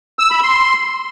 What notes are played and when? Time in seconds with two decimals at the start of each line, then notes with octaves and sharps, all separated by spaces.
0.19 E6
0.31 B5
0.42 C6